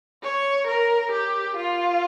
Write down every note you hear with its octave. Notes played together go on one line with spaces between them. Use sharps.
C#5
A#4
G4
F4